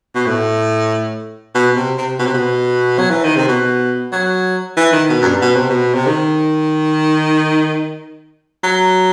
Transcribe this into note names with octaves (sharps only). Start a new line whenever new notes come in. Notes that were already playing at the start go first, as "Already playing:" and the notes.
B2
A2
B2
C3
C3
B2
C3
B2
F#3
E3
D#3
C3
B2
F#3
E3
D#3
B2
F#2
G2
B2
C3
B2
C3
D#3
F#3